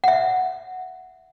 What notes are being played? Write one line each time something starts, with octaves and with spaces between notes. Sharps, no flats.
E5 F#5